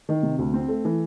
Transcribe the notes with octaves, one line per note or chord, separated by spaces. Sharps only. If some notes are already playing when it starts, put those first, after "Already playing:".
D#3
C3
D2
C4
A3
E3